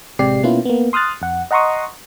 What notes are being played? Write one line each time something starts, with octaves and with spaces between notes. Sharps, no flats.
A1 C3 G#3 G4 D5 C7
B2 A#3 B3 C#4 E4 F4
A#3 B3
C6 D#6 F6 F#6 A6
F2 F#5
D#5 F#5 A#5 C6 C#6 D#6